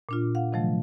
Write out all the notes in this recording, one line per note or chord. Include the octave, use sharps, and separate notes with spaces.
A#2 D4 F4
F5 F#5
C3 D#3 F3 F#3 A3